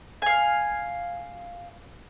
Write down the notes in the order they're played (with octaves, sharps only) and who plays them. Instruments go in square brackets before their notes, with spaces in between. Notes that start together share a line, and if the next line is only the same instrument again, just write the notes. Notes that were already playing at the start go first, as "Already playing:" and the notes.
[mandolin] F5 G#5